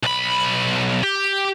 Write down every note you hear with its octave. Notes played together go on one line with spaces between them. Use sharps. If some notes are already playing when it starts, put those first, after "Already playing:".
B1 B5
G4